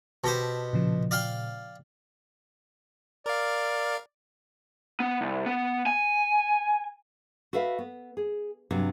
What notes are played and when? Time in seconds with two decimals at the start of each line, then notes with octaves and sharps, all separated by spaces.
0.24 B2 G4 C5 A5
0.73 A#2 C#3 F3
1.11 D5 F5 G5
3.26 A#4 D5 F5
5.00 B3
5.21 C2
5.46 B3
5.86 G#5
7.53 F#4 A4 B4 E5 F5
7.79 B3
8.17 G#4
8.71 G2 C3 F#3